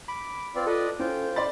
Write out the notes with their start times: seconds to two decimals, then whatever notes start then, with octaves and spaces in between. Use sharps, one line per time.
0.08 B5 D6
0.55 C4 F4 B4 D5
0.67 F4 A4 B4 D5 D#5
0.99 C#4 F4 C5 G5
1.36 D5 B5 C6 A6